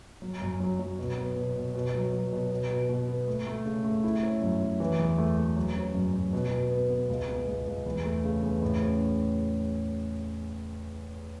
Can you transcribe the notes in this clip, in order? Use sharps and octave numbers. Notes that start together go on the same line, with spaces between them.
F#3
F#2
F#3
F#3
B2
B3
B2
B2
B2
F#3
F#3
B2
B2
B2
B2
B3
A3
A3
C#3
A3
E4
C#4
F#2
F#3
E3
E2
A3
A3
F#3
C#4
F#2
F#2
B2
B2
B3
B3
C#2
B3
C#2
C#2
E2
A3
C#3
E2
A2
C#4